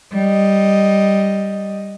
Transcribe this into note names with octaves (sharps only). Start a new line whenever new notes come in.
G3 D#5